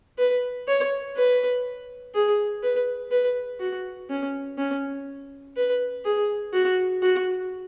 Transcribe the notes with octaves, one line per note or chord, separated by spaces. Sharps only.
B4
C#5
B4
G#4
B4
B4
F#4
C#4
C#4
B4
G#4
F#4
F#4